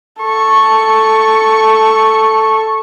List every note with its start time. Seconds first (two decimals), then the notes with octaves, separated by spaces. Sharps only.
0.22 A4 C#6